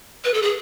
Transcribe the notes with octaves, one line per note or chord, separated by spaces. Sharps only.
B4
A4
G#4